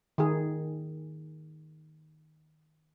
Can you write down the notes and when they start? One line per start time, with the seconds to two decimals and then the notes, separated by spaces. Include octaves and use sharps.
0.18 D#3 G#4